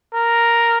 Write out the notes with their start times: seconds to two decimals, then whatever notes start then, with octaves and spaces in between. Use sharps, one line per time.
0.14 A#4